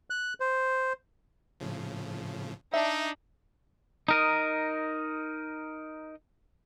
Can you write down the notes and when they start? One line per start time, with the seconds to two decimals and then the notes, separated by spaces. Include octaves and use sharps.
0.10 F#6
0.40 C5
1.60 A2 C#3 F3
2.74 D4 D#4 E5
4.08 D#4 A#4 D#5